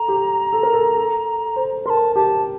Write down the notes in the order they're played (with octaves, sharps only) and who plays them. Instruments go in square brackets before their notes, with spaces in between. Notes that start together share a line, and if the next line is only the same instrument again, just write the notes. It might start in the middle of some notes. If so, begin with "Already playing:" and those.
Already playing: [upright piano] A4 [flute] A#5
[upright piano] G4
A4
A#4
A4
A4
C5
[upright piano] A#4 [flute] C6
[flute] A5
[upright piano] G4 [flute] A5